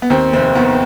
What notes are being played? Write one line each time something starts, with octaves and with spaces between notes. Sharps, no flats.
B3
D#2 C4
F1 C4
D#3 B3